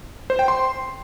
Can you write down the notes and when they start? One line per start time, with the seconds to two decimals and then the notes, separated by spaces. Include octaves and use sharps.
0.30 C5
0.39 G5
0.48 C6